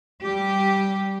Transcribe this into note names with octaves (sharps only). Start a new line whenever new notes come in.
G3 G4